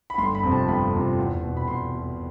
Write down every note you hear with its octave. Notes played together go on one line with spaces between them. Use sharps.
B5
G1 C6
B5
F2 C3 F3
A5
G1 B5
F2 C3 F3
E2
B2
B5
E2 C6
B2